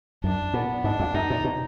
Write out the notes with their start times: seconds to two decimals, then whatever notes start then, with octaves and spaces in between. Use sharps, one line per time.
0.24 F#2 D4
0.54 A#2 B3
0.84 G#2 D4
1.00 F2
1.14 F#2 D#4
1.30 A#2
1.45 B2